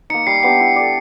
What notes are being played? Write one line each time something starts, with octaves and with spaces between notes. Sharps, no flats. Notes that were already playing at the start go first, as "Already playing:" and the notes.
A#3 D#4 C#7
G3 C7
B3 D4 G4 C7
E4
A4 D5